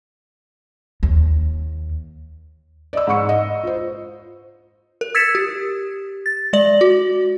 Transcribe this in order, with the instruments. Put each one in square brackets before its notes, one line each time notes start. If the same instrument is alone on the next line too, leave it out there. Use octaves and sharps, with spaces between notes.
[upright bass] D#2
[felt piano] D5 D#5 E6
G#2 G#3 B5 C#6 C#7
D#5
F4 C5
[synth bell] A#4
E6 G#6 A6 B6 C#7 E7
G4
A6
G#3 D5 F#7
F#4